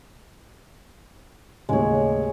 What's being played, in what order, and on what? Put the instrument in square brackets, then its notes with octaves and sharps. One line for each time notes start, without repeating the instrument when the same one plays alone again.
[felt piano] D#2 A2 C#3 [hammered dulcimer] G#3 C#5